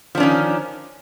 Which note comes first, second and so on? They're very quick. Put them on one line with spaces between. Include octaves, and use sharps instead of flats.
F3 D4 C#4 D#3